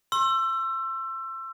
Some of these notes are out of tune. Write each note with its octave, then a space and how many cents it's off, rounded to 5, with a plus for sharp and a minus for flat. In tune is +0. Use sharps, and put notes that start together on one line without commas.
C6 +35 E6 +25